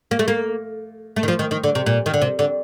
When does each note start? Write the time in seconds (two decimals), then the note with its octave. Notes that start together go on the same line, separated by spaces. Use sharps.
0.11 A#3
0.19 A3
0.28 A#3
1.16 A3
1.23 D#3
1.28 F3
1.39 D#3
1.51 D#3
1.64 D3
1.75 C3
1.86 A#2
2.06 D#3
2.14 D3
2.22 C3
2.39 D3